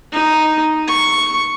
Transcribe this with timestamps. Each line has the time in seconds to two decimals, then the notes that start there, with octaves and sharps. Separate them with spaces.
0.13 D#4
0.88 C#6